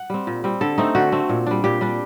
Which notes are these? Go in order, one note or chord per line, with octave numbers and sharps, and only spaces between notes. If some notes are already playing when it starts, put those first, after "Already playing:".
Already playing: F#5
G3 C4
A#2
G3 C4
D3 A4
A3 C4 D#4
D3 F#4
A3 C4
A#2
G3 D4
A#2 G4
G3 D4